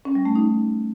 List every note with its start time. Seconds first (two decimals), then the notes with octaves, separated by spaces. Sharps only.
0.05 C#4
0.15 G3
0.25 A3
0.35 D#4